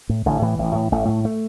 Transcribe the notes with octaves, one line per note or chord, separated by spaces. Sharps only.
A2
A1 D3
A2 E3
A1
A2
A1 A3
A2
A3